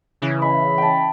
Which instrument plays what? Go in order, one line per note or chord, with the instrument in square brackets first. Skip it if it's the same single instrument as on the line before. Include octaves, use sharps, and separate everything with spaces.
[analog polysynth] C#3 E3
[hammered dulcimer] E5 [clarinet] B5
[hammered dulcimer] G5 A5